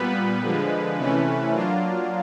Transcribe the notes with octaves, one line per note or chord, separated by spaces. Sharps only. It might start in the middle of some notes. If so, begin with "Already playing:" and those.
Already playing: A#2 G3 B3 B4
D3 F3 G#3
C3 E3 A3 C#4
F#3 A#3 D4 F4